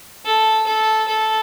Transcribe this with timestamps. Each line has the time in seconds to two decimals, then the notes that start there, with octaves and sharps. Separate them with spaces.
0.25 A4
0.67 A4
1.08 A4